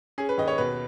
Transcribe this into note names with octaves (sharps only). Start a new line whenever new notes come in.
C#4 G#4
B4
D#2 D#5
C#5
B2 B4